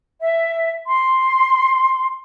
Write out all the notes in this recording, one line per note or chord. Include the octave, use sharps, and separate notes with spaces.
E5
C6